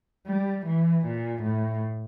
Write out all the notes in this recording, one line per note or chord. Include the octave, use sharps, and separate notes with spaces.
G3
E3
A#2
A2